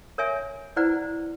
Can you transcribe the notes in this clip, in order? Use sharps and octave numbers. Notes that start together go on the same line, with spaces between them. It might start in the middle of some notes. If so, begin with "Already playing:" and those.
A#4 C#5 E5 G#5
E4 B4 C5 D5 F#5 A#5